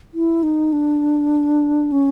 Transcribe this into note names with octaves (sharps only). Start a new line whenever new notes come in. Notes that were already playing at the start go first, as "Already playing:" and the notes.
E4
D#4
D4
C#4